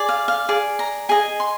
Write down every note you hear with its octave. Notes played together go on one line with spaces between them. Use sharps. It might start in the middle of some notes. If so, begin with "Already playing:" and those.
Already playing: G#4 D5
F5
F5
G#4 D5
A#5
G#4 D#5 G#5
C6